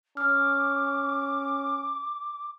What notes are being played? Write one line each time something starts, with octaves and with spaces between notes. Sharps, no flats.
C#4 D6 F6